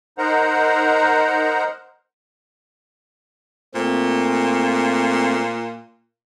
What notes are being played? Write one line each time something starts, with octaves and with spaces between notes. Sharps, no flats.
D#4 A#4 C5 F#5 A#5
A#2 A3 C4